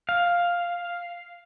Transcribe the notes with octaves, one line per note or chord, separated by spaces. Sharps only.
F5